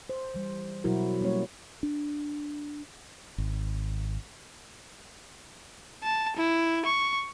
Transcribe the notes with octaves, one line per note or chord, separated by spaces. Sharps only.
C5
E3 G3
B2 F#3 E4 F#4 A#4
G3 A#3 C#4 C#5
D4
G#1
A5
E4
C#6